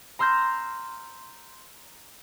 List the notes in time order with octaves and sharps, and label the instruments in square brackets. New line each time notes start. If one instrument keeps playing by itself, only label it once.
[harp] A#5 C6 E6 F6 G6 A#6